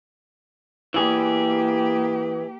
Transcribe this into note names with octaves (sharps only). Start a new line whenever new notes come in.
E3 A#3 G4 G#4